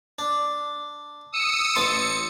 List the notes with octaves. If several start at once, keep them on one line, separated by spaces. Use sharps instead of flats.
D4
D#6 E6 C#7
A1 A5 C6 C#7